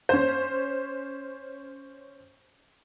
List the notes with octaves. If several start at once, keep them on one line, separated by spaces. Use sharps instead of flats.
C#4 C5